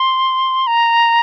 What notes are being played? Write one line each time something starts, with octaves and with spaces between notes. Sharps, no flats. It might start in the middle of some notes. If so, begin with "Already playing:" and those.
Already playing: C6
A#5